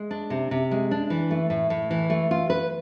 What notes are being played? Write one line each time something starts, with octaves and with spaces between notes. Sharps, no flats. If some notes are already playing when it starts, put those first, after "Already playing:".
Already playing: G#3
D4
C3
C3
G#3
D4
E3
A3
A2
A2
E3
A3
F4
B4